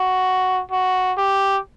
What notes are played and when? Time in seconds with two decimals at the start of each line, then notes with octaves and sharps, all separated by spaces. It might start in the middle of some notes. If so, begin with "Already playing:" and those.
Already playing: F#4
0.71 F#4
1.18 G4